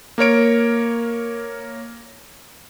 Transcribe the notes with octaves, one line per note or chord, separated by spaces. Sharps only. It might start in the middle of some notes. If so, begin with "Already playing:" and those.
A#3 A#4 C#5 D7